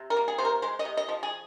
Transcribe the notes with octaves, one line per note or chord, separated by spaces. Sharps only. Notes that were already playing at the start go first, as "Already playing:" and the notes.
Already playing: C3
A#4
A#3
G#4
C3 C5
A#4
G#3 C5
D#5
C3
D#5
F3
G#4